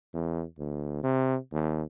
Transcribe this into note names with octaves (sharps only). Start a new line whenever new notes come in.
E2
D2
C3
D#2